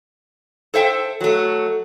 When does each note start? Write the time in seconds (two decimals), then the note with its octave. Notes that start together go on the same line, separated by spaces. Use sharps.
0.74 A4 C5 E5 G5
1.21 F#3 A3